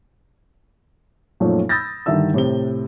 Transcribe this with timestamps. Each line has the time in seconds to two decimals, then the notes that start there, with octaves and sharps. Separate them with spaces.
1.40 F#2 A#2 F3 A3 C#4 D#4
1.69 B5 D#6 E6 G6 A6 A#6
2.06 G2 D3 D#3 E4 E5 E6
2.34 A2 C3 C4 G7